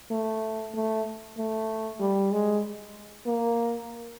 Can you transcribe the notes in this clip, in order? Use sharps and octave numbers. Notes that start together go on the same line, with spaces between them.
A3
A3
A3
G3
G#3
A#3